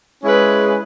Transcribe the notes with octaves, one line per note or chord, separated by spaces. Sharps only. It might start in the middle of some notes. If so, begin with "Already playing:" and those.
G#3 C#4 E4 G#4 B4